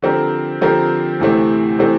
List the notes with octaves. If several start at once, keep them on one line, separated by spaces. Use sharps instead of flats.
D3 F3 C4 G4 A#4
D3 F3 C4 G4 A#4
D2 C3 E3 A3 C4
C3 E3 A3 C4